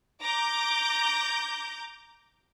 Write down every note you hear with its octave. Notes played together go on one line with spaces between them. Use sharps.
A#5 D6 G6